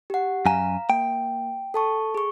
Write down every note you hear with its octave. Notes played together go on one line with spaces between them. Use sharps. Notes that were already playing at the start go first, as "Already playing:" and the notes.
G4 F#5
F#2 F5 G#5 A#5
A#3 G5
A4 A5 C#6
G#4 C#6